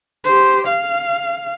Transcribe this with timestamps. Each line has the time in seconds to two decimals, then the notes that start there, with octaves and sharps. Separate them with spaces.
0.25 G4 C5
0.67 F5